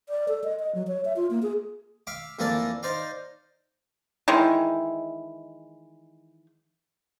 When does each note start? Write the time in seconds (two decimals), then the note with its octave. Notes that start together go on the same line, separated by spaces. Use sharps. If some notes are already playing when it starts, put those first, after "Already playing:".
0.09 D5
0.28 A4
0.44 D#5
0.60 D#5
0.75 F#3
0.88 C#5
1.05 E5
1.16 F4
1.31 A#3
1.43 G#4
2.07 E5 F5 D6
2.39 F2 E3 A#3 A4 D5 A5
2.83 D#4 C5 D5 F5
4.28 D#3 E3 G#3